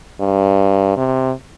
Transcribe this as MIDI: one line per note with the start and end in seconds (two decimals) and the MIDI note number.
0.20 0.95 43
0.97 1.32 48